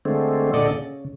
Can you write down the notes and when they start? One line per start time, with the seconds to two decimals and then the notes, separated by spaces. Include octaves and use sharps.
0.05 D3 G#3 A3 C4
0.54 A#2 D3 A4 D5 D#5
0.70 C#3